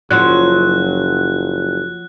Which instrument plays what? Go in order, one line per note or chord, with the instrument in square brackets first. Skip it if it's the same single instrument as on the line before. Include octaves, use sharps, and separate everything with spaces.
[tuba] F#1 [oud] F3 F#3 C#4 [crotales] F#6